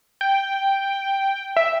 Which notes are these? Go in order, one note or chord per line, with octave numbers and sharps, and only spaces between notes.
G5
E5